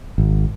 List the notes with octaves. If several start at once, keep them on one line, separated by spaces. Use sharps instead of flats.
G#1